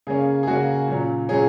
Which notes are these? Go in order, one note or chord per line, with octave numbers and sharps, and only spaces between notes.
C#3 A#3 C#4 G#4
G#4
C#3 A#3 C#4 F#4
A#2 F#3 C#4
A#2 F#3 C#4 G#4